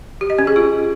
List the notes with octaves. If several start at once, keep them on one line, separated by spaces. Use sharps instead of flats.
G4
D#5
C#4
G#4
F4